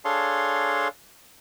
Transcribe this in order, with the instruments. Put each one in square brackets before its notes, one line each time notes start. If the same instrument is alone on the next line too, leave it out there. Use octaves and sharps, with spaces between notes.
[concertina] D4 G#4 A4 C#5 F5 C6